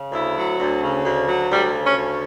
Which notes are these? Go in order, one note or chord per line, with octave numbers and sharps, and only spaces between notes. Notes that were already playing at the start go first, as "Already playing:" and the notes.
Already playing: C#3
D2 E4
F#3
D2
C#3
D2
F#3
D2 G3
C#3
C#4
D2